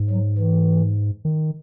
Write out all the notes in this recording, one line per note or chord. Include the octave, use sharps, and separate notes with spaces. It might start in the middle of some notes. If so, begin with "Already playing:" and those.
Already playing: G#2
F#3
E3
D#3